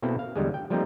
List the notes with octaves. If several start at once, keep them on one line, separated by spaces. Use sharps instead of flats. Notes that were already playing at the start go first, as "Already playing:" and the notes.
B2 A#3 C4 E4 A4
F5
E2 D3 G3 G#3
G5
F3 G3 A3 A#3 C4 D#4